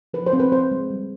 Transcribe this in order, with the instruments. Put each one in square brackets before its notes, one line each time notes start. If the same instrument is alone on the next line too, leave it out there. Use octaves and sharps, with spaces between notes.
[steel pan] F3 B4
C5
C4
B4
C4 C5
G#3
G3